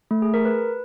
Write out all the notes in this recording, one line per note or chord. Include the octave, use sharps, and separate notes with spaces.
A3
G#4
A#4
B4